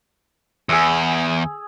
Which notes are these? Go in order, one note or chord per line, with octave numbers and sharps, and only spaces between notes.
E2 G#4 E6